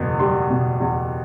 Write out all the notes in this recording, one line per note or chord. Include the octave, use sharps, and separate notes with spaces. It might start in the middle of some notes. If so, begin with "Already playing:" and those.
Already playing: F#1 E2 B2
G3 C6
B2
E2